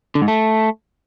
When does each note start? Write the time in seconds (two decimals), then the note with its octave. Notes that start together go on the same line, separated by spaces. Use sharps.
0.15 D3
0.22 G#2
0.28 A3